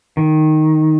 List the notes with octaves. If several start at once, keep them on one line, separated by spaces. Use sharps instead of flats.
D#3